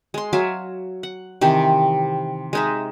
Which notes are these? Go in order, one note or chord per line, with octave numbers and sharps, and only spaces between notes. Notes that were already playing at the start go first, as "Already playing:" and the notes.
G#3 C6
F#3 E5 F5 G#5
F#5
C3 D#3 E3 G4
G#3 D#4 E5